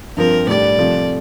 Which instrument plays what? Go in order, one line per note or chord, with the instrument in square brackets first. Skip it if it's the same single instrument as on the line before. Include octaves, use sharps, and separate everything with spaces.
[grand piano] G2 F3 C4 [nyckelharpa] A#4
[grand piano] A2 G3 D4 [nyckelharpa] D5
[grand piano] C3 F3 A3